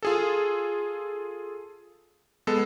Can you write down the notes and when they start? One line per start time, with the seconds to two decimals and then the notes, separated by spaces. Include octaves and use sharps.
0.03 F4 G#4 A4
2.47 G#3 B3 A4